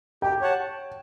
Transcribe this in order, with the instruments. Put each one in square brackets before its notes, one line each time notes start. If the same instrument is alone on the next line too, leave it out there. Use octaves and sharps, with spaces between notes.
[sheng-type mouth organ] G4 [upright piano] G5
[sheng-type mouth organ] C#5 F#5 A5